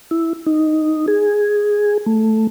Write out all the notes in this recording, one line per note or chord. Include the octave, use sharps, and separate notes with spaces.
E4
D#4
G#4
A3